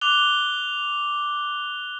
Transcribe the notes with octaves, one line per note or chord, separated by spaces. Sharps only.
D6 F#6 F7 G7